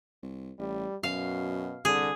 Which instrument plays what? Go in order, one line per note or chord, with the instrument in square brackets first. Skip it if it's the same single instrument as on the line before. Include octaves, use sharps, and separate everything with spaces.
[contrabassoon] C2
[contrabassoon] A1 [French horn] G3
[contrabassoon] F#2 [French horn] B2 [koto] F5
[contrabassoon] C2 [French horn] D3 [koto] G#4